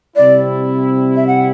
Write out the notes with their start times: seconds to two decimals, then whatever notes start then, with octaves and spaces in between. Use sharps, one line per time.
0.16 C3 G3 C4 E4 D5
1.16 E5
1.27 F#5